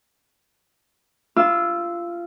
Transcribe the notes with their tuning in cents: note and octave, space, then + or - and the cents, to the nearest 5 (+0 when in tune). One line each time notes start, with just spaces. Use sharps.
F4 -20 E6 +0